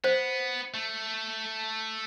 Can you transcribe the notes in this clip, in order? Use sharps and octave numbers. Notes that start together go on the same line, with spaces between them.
B3 C5
A3